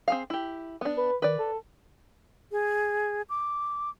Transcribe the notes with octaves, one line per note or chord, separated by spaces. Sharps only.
C4 G#4 F5
E4 G4
B3 D4
B4
D#3 B4 D5
A4
G#4
D6